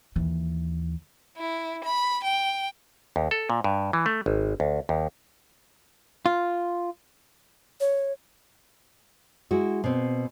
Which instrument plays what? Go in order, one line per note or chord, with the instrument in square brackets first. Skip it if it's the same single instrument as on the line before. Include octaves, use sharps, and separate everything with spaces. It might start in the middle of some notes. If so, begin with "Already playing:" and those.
[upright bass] D#2 E3
[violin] E4
B5
G5
[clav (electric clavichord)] D#2
A4
A#2
G2
E3
A3
G#1
D2
D#2
[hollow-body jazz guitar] F4
[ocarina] C#5
[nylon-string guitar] G#3 E4 F#4
B2 C4